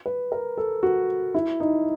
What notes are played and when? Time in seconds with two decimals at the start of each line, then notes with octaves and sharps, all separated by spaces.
0.06 B4
0.32 A#4
0.57 A4
0.83 F#4
1.34 E4
1.60 D#4